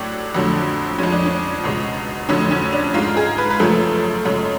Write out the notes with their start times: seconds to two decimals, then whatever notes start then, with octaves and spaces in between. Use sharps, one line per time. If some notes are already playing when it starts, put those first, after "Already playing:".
Already playing: A2 F#3 A3 D4
0.34 F2 D3 F#3 A3
0.98 F2 F3 G#3 C#4
1.12 D4
1.26 C#4
1.64 C#2 B2 G#3
2.29 F2 D3 F#3 A3 C#4
2.51 C#4
2.73 D4
2.94 G#2 G#3 F4
3.17 G#4
3.38 B4
3.50 B4
3.59 F#2 C#3 F3 A3 A4
4.25 F#2 C#3 G#3